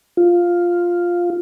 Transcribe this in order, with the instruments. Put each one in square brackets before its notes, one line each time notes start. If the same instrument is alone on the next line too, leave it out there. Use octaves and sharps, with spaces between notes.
[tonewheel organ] F4